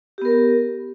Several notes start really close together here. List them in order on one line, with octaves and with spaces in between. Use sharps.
G4 B3 A#4